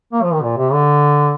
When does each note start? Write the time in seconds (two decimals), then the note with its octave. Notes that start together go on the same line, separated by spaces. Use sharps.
0.13 A#3
0.23 F3
0.33 D#3
0.43 A#2
0.57 C3
0.72 D3